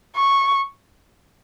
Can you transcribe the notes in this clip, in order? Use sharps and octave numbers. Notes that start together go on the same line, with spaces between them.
C#6